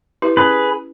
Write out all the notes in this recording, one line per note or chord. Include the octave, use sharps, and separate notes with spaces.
E4 G4 B4
C#4 G#4 B4